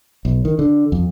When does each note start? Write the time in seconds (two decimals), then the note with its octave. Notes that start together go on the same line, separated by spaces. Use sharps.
0.25 B1
0.45 D#3
0.59 D3
0.92 F2